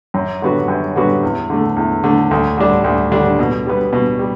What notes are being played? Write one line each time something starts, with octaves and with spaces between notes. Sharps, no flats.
F#2
D3 G3 B3 F#4
F#2
D3 G3 B3 F#4
E2
D3 A3
E2
D3 A3
D2
D3 G3 D4
D2
D3 G3 D4
B2
G3 B3
B2
G3